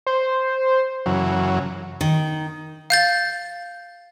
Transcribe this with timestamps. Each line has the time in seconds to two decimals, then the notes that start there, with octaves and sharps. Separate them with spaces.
0.07 C5
1.06 F#2 C#3 E3 F#3
2.01 D#3
2.90 F5 G6 A6